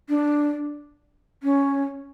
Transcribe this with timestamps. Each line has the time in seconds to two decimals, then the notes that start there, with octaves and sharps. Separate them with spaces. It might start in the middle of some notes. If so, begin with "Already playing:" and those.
0.09 D4
1.43 C#4